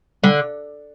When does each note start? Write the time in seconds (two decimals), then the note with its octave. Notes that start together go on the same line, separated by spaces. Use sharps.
0.24 D3 G3